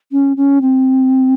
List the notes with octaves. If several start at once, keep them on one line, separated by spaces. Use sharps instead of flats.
C#4
C#4
C4